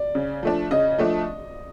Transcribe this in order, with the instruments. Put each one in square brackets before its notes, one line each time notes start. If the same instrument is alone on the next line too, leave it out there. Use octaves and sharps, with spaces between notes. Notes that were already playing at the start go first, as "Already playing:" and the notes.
Already playing: [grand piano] D5
[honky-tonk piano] C#3
F3 A3 D4
[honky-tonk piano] C#3 [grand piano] D#5
[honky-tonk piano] F3 A3 D4